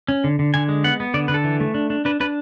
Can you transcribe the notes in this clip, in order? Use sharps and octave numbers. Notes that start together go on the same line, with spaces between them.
C#4
D3
D3
D3 G#5
G#3
B3 F#5
B3
D3 D5
D3 B4
A4
E3
A3
D4
D4
D4 B4
D4 B4